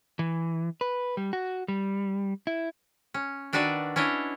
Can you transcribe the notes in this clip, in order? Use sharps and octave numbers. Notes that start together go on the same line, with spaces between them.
E3
B4
G3
F#4
G3
E4
C#4
D#3 D4 F#4 B4 D5 E5
C#4 D4 E4 C#5 D#5